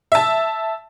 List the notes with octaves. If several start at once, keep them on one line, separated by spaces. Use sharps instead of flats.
E5 A5